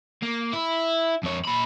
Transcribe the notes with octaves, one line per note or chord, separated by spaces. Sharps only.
A#3
E4
F2 C#5
A#2 B5